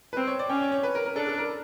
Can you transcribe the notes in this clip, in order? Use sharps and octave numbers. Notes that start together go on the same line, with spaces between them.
B4
C4 C5
C#5
D5
C#4 G5
C#5
C#5
B4
A#4
A#4
D4 A4
A4
A#4